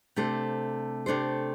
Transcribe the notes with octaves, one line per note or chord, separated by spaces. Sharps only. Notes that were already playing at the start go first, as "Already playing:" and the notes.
C3 A3 D4 A4 C5
C3 A3 D4 A4 C5